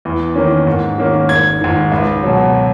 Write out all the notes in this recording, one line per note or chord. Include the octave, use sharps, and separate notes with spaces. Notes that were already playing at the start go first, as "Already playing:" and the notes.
E2
D#3 A#3 C#4
G#2
D#3 A#3 C#4
G#1 G#6
G#2 D#3
C#2
B2 F#3